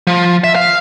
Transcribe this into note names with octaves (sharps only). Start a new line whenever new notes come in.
F3
E5
F5